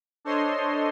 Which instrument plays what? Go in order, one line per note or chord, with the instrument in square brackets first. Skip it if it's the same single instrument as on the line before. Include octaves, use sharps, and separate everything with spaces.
[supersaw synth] D4 A4 C5 C#5 D#5 C6